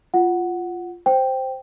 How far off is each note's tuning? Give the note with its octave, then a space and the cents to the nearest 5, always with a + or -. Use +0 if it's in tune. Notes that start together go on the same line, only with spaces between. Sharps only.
F4 -5 F#5 +0
C5 +0 G5 +0